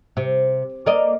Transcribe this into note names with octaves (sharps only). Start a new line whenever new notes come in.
C3
A#3 D5 D#5